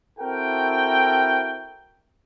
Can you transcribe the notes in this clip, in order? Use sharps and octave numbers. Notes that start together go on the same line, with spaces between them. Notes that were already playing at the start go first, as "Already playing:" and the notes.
C4 E4 F#4 A4 A#4 G5